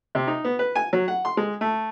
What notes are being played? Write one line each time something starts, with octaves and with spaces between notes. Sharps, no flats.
C3
D#4
B3
B4
G#5
F#3
F#5
C6
G#3
A3